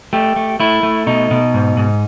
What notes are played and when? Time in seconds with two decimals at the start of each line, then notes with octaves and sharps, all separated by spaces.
0.13 A3 G4
0.36 A3
0.60 A3 E4
0.83 A3
1.06 B2 D#4
1.31 B2
1.54 G#2
1.77 G#2